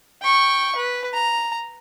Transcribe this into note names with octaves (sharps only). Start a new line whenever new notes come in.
G5 C#6
B4
A#5